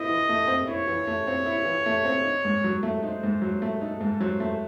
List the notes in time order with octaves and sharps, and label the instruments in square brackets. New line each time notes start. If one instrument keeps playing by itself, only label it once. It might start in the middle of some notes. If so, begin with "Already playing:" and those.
Already playing: [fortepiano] C4 E4 [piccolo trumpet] D#5
[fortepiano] E3
A3
C4
[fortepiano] E4 [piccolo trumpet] C#5
[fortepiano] E3
A3
C4
E4
E3
A3
C4
D#4
G#2
F#3
A3
[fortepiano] D#4 [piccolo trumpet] C5
[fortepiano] G#2
F#3
A3
[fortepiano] D#4 [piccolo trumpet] A4
[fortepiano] G#2
[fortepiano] F#3 [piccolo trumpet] C5
[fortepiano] A3